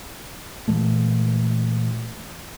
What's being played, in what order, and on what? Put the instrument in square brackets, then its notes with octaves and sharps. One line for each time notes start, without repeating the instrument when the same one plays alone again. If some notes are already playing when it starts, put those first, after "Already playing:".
[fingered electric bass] A#2 E3 G#3 A3